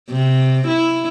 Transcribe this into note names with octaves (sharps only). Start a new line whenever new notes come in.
C3
E4